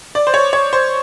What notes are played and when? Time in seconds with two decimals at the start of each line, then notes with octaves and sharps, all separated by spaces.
0.15 D5
0.27 C5
0.34 C#5
0.53 C#5
0.73 C5